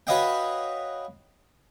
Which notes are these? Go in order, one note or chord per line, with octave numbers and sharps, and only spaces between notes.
F#4 B4 C#5 D#5 F5 G5